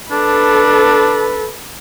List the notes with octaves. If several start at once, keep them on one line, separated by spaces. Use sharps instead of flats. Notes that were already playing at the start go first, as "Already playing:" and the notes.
D4 A4 B4